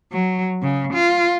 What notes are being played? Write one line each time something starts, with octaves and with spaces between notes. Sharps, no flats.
F#3
C#3
F4